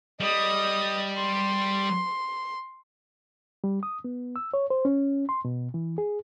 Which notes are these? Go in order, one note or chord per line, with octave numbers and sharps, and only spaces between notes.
G3 D#5 D#6
C6
G3
D#6
B3
E6
C#5
C5
C#4
C6
B2
E3
G#4